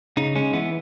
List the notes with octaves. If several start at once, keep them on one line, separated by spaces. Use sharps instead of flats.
C#3 D#4
G#3 C#4
E3 B3